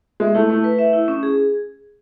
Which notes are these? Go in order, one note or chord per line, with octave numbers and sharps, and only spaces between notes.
G#3 E5
A3 E4
A3 E4
B4
E5
E4
C#4
G#4